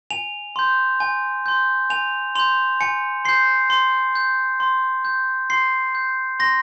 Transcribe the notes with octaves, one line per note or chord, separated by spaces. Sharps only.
G#5 F7
C6 G6
G#5
C6 G6
G#5 F7
C6 G6 F7
G#5 C#7
C6 G6 C7
C6
G6
C6
G6
C6 C7
G6
C6 A#6